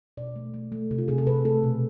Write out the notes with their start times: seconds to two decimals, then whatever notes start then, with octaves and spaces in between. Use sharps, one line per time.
0.17 B2 D5
0.36 A3
0.54 A3
0.72 A3
0.91 C3
0.98 F4
1.08 C3 G#4
1.18 A4
1.27 C3 B4
1.45 A3 A4
1.64 B2